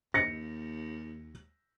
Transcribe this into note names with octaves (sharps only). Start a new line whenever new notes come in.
D#2 A#6 C#7